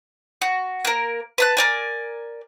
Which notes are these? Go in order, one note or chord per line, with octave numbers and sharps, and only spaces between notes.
F#4
A#3 A#4
B4 A5 F#6
A#4 D5 G#5